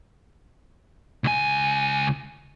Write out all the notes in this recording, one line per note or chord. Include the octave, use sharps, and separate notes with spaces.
C#2 G#5